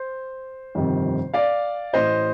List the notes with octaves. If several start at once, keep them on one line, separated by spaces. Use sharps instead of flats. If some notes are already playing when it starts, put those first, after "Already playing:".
Already playing: C5
G1 F2 C3 D#3
D5 F5
A1 A2 C5 D#5